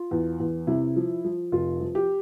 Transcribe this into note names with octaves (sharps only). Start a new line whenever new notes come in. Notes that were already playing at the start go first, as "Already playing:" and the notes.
Already playing: F4
E2
E2
C3 E4
F3
F3
F1 F4
F3
G4